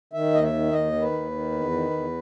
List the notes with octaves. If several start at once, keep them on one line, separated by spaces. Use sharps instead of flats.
D#3 E5
D#2 D#5
E5
D#3
D#2 D#5
D#3
B4
D#2
D#3
E2
D#3
E2